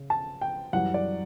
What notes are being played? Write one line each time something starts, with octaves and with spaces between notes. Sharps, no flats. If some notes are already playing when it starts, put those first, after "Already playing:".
Already playing: C#3
A5
G5
F#2 E3 G3 F#5
D5